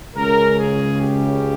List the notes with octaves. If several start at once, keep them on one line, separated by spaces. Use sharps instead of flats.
C#2 C#3 G#3 C#4 A#4
G#4
G4